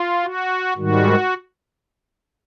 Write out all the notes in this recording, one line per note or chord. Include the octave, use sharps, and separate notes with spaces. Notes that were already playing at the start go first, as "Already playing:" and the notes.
Already playing: F4
F#4
G#2 D#3 G3 F#4